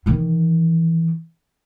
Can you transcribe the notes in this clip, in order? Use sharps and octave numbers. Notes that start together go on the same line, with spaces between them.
D#3 E3